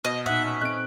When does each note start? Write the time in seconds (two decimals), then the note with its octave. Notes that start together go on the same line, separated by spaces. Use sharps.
0.05 B2 D#5
0.26 A#2 D#4 E5 F#5
0.45 C#4
0.61 C4 A4 D#5 F#6 D7